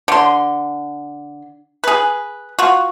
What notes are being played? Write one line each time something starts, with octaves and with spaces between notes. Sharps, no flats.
D3 C6
G#4 B4
F4 F#4